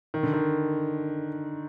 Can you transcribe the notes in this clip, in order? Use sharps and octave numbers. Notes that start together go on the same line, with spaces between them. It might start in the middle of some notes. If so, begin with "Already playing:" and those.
D#3
D3
D#3